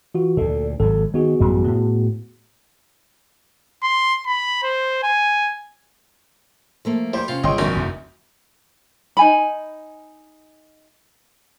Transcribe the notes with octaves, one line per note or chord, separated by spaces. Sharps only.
E3 F4 F#4
D2 A#2 A4
G#1 G#2 F#3 A4
D#3 B3 F#4 G#4
A1 F#2 G3
A2
C6
B5
C5
G#5
F3 A3 A#3
G3 C5 C6
C3 C#4 F4
G1 C#2 B2 D#5 G5 C6
A#1 F2 A#2 D#4 F#4 A#4 D5
F1 E2
D#4 G#5 B5